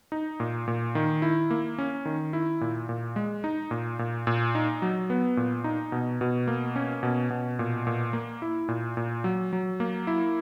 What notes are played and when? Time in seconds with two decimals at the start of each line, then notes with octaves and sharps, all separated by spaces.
0.12 D#4
0.40 A#2
0.68 A#2
0.95 D#3
1.22 E4
1.50 A#3
1.78 C#4
2.05 D#3
2.33 E4
2.61 A#2
2.89 A#2
3.16 G#3
3.44 D#4
3.71 A#2
3.99 A#2
4.27 A#2
4.55 D#4
4.82 F#3
5.10 B3
5.37 A#2
5.64 D#4
5.92 B2
6.21 B2
6.48 A#3
6.76 C#4
7.03 B2
7.30 B2
7.59 A#2
7.87 A#2
8.13 A#3
8.42 E4
8.69 A#2
8.97 A#2
9.24 F#3
9.53 F#3
9.80 A#3
10.07 E4